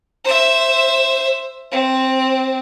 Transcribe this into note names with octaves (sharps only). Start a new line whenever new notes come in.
C5 E5
C4